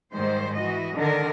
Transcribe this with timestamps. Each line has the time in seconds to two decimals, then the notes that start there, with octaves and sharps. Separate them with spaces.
0.13 G#2 D#3 G3 C5
0.56 E3 F#4 D#5
0.95 D3 D#3 A#4